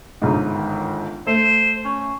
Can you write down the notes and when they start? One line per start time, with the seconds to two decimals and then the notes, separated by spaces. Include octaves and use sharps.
0.22 G1 G#2 D#4
0.49 D#3
1.27 A3 C5
1.85 C#4